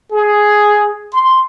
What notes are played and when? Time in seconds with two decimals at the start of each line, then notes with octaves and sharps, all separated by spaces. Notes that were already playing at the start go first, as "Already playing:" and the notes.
0.11 G#4
1.13 C6